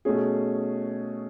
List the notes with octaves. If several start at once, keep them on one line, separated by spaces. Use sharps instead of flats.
B2 A3 C#4 G#4